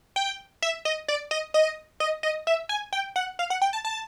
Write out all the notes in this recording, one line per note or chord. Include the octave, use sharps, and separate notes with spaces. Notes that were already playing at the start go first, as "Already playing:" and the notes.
G5
E5
D#5
D5
D#5
D#5
D#5
D#5
E5
G#5
G5
F#5
F5
F#5
G5
A5
A5